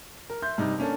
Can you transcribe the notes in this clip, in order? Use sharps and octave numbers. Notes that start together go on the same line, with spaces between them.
A#4
E5 C6 G6
G2 C3 D#4
A#3 C#4 D4 A4